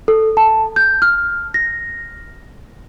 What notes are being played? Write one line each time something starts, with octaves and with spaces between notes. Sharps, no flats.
A4
A5
G6
F6
A#6